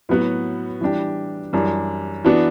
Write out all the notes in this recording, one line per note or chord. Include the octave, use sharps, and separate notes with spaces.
A2 F#3 B3 F#4
E3 G3 D4 G4
F#2 E3 G3 D4
E3 B3 D4 F#4